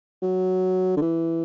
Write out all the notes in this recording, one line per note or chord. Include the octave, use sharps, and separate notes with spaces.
F#3
D3
E3